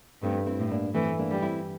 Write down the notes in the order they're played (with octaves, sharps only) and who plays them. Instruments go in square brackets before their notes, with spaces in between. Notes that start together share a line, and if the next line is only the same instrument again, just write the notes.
[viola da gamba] G2 [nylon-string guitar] A3 C4
[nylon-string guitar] C4 E4
[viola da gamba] A2
[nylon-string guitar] A#3 D4
[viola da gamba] E3 [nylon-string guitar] A3 C4
[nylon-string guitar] A#3 D4
[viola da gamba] G3
[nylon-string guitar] C4 E4